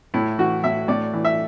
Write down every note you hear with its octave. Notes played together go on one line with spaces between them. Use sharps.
A2 E4
E3 F#4
A2 E5
A2 D5
E3
E5